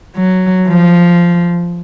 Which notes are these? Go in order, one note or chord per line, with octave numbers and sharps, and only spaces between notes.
F#3
F3